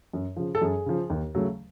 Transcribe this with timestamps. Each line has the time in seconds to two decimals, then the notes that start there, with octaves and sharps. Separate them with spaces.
0.13 F#2
0.37 C#3 F3
0.55 A4
0.61 F#2 G#4
0.86 C#3 F3
1.10 D#2
1.34 C#3 F#3 A3